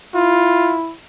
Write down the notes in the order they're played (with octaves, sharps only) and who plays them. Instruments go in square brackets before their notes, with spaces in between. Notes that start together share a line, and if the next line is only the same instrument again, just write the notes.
[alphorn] E4 [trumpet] F4